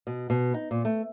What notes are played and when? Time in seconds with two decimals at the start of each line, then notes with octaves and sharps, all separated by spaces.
0.07 B2
0.30 B2
0.54 D#4
0.71 A#2
0.85 A3